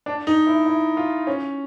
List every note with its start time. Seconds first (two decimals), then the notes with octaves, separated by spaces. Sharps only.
0.06 D4
0.27 D#4
0.47 E4
0.66 E4
0.97 F4
1.27 C#4